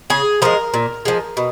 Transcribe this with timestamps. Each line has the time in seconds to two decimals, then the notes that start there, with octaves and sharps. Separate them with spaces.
0.10 C#3 G#4
0.42 F3 G#3 A#4
0.74 A#2
1.05 F3 G#3
1.37 B2